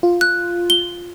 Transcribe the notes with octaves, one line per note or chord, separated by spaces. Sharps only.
F4
F#6
G7